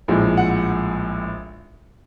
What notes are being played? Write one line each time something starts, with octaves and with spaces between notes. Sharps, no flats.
A#1 A2 F3 G#3
F#5